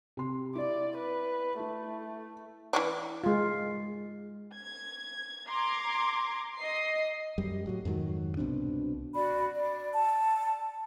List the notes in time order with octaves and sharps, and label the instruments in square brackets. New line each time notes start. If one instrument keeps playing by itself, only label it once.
[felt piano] C3 C6
[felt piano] E4 [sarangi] D5
[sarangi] B4
[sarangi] A3 [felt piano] E4
[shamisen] E3 C#4 D4
[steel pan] G#3 F4
[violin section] G#6
A#5 C6 D6 G#6
D#5 C7
[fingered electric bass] F#2 G3
A2 F#3
F2 G#2 D#3 F#3
C2 B2 C4 D4
[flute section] F#4 D5 B5
D5
A5